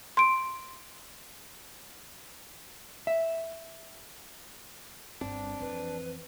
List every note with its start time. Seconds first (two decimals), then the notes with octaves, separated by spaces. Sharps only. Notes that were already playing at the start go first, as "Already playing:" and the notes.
0.17 C6 D7
3.07 E5
5.21 G1 G2 C4 D4
5.60 F2 E3 B4